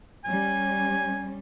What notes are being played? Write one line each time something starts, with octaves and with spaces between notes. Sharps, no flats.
G3 C#4 G#5